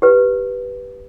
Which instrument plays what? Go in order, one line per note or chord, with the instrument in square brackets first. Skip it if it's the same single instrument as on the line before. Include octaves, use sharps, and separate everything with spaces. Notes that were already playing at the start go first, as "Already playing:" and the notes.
[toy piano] G4 B4